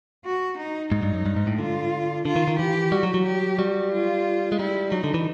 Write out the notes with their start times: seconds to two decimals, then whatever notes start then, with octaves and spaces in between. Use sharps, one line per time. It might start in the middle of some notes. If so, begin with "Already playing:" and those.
0.25 F#4
0.58 D#4
0.92 G#2 D#4
1.02 G2
1.14 F#2
1.26 G2
1.36 G#2
1.47 A2
1.58 D3 F4
2.25 D3 F4
2.36 D#3
2.48 D#3
2.59 E3 G4
2.91 G3 F#4
3.03 F#3
3.14 F#3
3.26 G4
3.58 G3 F#4
3.92 F4
4.52 G#3
4.59 G3 E4
4.91 F#3 D#4
5.04 D3
5.14 E3